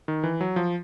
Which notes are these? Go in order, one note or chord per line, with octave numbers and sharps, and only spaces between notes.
D#3
E3
F#3
F3